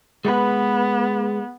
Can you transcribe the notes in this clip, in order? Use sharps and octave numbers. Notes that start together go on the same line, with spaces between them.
G#3 B3 B4